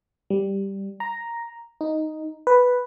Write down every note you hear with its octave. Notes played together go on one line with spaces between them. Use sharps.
G3
A#5
D#4
B4